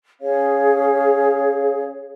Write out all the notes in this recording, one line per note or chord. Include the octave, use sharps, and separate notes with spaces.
C#4 G#4 C#5 F5